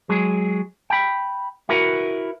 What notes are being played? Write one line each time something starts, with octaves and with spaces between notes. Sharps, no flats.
F#3 G#3 G#4
G5 B5
E4 F#4 A#4 B4